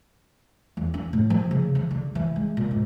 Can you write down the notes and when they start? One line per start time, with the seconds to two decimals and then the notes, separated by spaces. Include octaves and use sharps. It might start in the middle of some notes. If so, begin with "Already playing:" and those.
0.77 E2
0.94 D4
1.13 A2
1.30 F3
1.51 C#3
1.75 E3
1.91 D3
2.15 E3
2.36 G#3
2.57 A#2
2.71 G#2